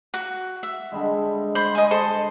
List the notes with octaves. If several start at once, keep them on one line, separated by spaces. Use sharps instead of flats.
F#4
E5
D3 G3 G#3
C5 B5 C6
D#5 G#5
A4 C5 C6